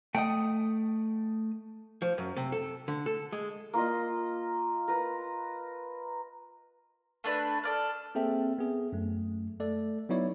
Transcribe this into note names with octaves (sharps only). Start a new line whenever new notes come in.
A3 D#5 F#5 G5 D#6
F3
F#2
C3
A4
D3
A4
G#3
A#3 F4 D#5
A#4 B4
A3 D4 B4
A4 D5 F6
A#3 C4 G#4 A4 E5 G5
B3 G#4
F#2 A3
A3 A4 D5
F#3 B3 D#4 E4 C#5 D5